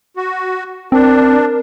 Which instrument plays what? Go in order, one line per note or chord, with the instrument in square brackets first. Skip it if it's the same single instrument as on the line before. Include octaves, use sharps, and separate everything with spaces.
[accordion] F#4
[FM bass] C4 [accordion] D4 [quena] A#4